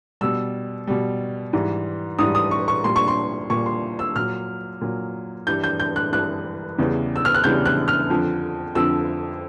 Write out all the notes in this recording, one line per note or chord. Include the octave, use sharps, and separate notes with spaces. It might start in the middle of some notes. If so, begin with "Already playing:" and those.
B2 G3 E6
B2 G3
G#2 E3 G3
G#2 E3 G3 D#6
D#6
C#6
C#6
A#2 G3 C6
C#6
C6
A#2 G3 C#6
C6
E6
A#2 F#3 F6
A#2 F#3
G2 E3 G3 G6
G6
G6
F#6
G2 E3 G3 F#6
E2 C#3 E3 G3
E6
F6
F#6
E2 C#3 E3 G3 G6
F#6
F6
F2 D3 F3
F2 D3 F3 E6